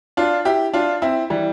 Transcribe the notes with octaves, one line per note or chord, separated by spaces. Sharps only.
D4 F4
E4 G4
D4 F4
C4 E4
E3 G3